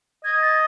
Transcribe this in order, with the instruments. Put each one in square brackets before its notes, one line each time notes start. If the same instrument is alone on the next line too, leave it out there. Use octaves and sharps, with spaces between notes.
[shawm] D#5 [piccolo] G#6
[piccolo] A6